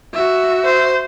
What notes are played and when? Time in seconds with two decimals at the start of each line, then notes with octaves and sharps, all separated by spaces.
0.14 F#4 E5
0.65 C5